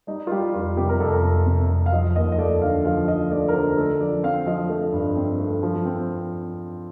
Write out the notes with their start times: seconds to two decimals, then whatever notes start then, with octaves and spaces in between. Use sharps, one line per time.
0.07 G3 D#4
0.27 F4
0.31 G3 G4
0.54 F2 F4
0.77 C3 G4
0.89 A#4
1.00 F2 A4
1.23 C3
1.46 C3
1.69 F2
1.86 F5
1.92 F3 D#5
2.16 D#2 D#5
2.32 D#5
2.38 A3 D5
2.62 D3 F5
2.85 F3 F5
3.08 F3 D#5
3.31 A3 D5
3.48 A#4
3.54 D3 C5
3.77 A3 A4
4.00 F3 D5
4.23 C4 F5
4.46 F3 D#5
4.69 A3
4.93 G2
5.17 C4
5.39 A3
5.63 F3
5.85 C4